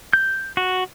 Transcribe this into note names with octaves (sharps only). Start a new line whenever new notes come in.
G6
F#4